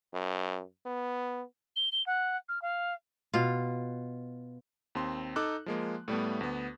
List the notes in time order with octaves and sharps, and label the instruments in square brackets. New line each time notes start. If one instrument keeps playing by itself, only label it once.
[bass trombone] F#2
B3
[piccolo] G7
G7
F#5
F6
F5
[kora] B2 F4
[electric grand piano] D#2 C4 C6
D#4 A4 D6 E6 F#6
F3 G#3 A#3
A2 G3 A3 B3
D2 B3